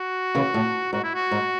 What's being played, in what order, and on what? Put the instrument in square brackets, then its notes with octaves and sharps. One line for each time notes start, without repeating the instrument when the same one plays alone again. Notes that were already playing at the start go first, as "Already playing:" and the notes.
Already playing: [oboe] F#4
[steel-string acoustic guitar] C#3 E3
A2
[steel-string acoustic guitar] G#2 [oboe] F#4
[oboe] E4
F#4
[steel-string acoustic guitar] G#2